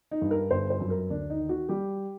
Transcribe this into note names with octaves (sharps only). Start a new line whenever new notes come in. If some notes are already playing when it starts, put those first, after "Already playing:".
D#4
G2
A#4
G1 C5
C5
F#2
A#4
D2 D4
D#4
D#3
F#4
G3 G4